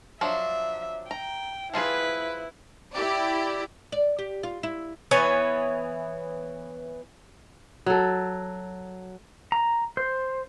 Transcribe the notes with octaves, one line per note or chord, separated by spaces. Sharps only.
F3 F#3 D4 E5
G5 A#5
F3 E4 F4 G#4 B4
E4 G4 D5
D5
G4
F4
E4
E3 B3 C#5 G#5
F#3 A4
A#5
C5